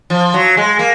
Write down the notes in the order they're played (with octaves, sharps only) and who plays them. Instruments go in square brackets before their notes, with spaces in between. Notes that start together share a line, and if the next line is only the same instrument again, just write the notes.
[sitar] F3
F#3
G#3
A#3